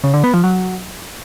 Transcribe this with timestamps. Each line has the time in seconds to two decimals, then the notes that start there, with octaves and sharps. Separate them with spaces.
0.04 C#3
0.14 D3
0.24 B3
0.34 F3
0.44 F#3